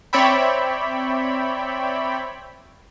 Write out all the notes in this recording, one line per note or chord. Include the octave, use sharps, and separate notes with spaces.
C4 C#5 D5 E5 G5 B5